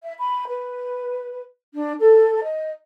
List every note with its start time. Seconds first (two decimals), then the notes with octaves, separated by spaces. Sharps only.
0.03 E5
0.19 B5
0.47 B4
1.74 D4
1.99 A4
2.43 D#5